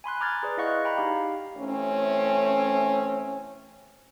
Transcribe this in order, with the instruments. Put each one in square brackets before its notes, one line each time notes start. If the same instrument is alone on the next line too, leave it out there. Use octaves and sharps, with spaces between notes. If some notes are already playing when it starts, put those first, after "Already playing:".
[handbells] G#5 B5 C6 F#6
A#5 D6 F6 G#6 A6
G#4 B4 D5
E4 D#5 F5 F#5 C#6 F#6
G5 A#5 B5
D#4 G4 F5
[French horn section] E3 A3 C4 C#4